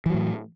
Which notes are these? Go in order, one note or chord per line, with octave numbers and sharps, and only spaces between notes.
A2 E3 F#3